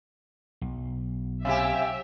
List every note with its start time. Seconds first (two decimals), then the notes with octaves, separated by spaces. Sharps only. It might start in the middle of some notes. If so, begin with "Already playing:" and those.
0.61 B1
1.45 C3 G4 E5 F5 G#5